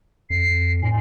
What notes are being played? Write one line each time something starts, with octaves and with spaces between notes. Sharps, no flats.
F2 C7
A2 G#5